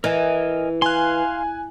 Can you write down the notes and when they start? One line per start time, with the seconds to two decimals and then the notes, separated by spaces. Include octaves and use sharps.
0.04 E3 A#4 D#5 G#5
0.82 F5 G#5 C6 F#6